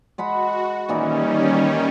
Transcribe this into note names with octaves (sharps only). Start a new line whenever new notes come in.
G#3 F#4 F#5 B5
A#2 D#3 E3 G3 C#4 D#4